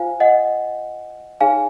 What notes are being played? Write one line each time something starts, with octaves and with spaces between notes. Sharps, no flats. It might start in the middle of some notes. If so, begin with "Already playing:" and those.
Already playing: F4 C5 F5 G#5
D#5 F#5
D#4 G#4 C#5 F5 G#5